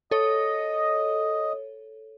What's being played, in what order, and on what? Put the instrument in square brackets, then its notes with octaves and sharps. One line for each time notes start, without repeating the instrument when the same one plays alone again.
[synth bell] A4 C#5 [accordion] D#5